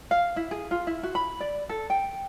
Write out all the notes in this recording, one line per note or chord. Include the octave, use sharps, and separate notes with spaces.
F5
E4
G#4
F4
E4
F#4
B5
D5
A4
G5